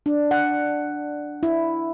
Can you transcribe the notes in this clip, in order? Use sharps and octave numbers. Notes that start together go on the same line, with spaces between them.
D4
F#5
E4